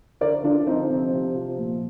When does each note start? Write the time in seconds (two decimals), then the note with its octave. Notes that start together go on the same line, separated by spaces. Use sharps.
0.21 D3 A#4 D5
0.43 D3 D4 F4
0.66 F3 C4 D#4
0.90 C3 C4
1.14 C3
1.35 F3
1.59 A#2